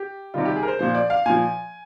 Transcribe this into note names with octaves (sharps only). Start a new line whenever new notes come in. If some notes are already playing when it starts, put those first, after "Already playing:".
Already playing: G4
C3 D#3 G3 F4
G4
G#4
A#4
C5
A#2 F3 C5
D5
F5
A#2 F3 G#5